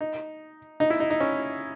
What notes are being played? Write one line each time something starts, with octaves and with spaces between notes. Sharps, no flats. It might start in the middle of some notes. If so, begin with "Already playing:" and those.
D#4
D#4
E4
D#4
D#4
C#4